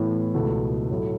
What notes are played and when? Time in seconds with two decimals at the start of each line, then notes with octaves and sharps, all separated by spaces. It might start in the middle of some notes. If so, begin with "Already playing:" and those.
Already playing: A2 E3 B3
0.34 C#2 B2 A3 E4
0.90 A2 F#3 A3 E4